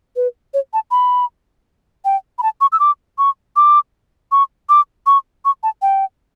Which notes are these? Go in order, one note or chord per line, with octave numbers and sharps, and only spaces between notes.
B4
C#5
A5
B5
G5
B5
A5
C#6
E6
D6
C#6
D6
C#6
D6
C#6
C#6
A5
G5